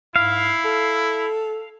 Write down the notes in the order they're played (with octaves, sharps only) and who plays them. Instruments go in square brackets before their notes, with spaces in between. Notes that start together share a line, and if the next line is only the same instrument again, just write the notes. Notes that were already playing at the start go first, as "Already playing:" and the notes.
[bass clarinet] G#2 [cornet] E4 [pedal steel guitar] F5
[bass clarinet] A4